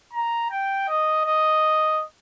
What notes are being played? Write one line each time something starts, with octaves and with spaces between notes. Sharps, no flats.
A#5
G5
D#5
D#5